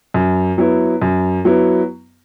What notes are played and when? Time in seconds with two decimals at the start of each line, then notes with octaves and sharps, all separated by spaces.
0.14 F#2
0.58 F#3 B3 E4
1.02 F#2
1.45 F#3 B3 E4